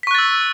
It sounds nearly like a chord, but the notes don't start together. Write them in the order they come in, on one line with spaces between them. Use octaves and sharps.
B6 C#6 F#6 A6 E6